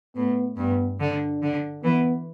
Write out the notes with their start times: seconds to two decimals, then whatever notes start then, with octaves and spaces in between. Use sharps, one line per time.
0.16 A2 B3
0.57 G2 B3
1.00 D3 D4
1.42 D3
1.84 E3 B3